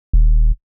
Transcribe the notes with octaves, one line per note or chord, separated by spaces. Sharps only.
D#1